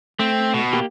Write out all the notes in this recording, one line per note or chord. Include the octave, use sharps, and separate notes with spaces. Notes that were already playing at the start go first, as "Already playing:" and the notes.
A3 C4
B2
A#3 G4